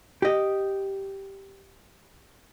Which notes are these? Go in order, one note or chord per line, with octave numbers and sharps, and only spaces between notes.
G4 D#5